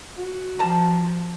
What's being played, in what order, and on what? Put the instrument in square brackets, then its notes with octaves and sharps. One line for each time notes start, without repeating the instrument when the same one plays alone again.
[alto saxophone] F#4
[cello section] F3 [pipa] G3 A5 A#5